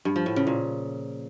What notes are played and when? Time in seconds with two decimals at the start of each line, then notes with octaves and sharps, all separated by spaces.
0.05 G2
0.16 F3
0.26 A2
0.36 C#3
0.47 A#2